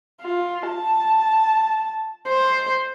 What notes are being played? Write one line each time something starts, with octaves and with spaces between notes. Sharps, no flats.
F4
A5
C5